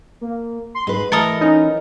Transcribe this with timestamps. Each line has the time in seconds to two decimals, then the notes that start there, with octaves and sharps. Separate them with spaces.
0.21 A#3
0.75 C6
0.87 G#2 G#3 B4
1.12 E3 A3 A4 A#4 D#5
1.41 C#4 D#4